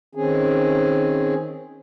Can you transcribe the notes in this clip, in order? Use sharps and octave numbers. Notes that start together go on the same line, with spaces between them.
D#3 C4 C#4 G#4